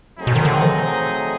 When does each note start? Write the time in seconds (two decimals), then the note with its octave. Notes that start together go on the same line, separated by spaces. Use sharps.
0.19 F#3 A3 C4 D#4 G#4
0.27 B2
0.36 D#3
0.45 D3
0.53 D#3
0.62 F3